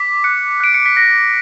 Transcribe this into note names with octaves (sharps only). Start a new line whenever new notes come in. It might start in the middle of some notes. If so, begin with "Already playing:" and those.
Already playing: D6 B6
F#6 C#7
F#6 D7
C#7
B6
F#6 A#6